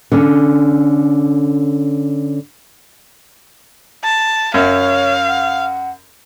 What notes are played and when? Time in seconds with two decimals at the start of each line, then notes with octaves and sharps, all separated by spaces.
0.12 D3 C#4
4.04 A5
4.54 F#2 C#5 F5
5.28 F#5